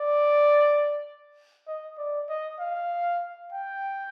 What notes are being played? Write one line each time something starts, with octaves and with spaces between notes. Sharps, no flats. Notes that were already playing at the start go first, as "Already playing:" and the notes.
Already playing: D5
D#5
D5
D#5
F5
G5